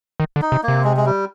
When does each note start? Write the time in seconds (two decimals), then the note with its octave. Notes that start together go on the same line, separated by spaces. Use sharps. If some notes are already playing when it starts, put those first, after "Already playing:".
0.20 D#3
0.36 D3
0.42 D#4
0.52 C3
0.63 C3 A#3
0.84 G#3
0.97 G#3
1.06 G3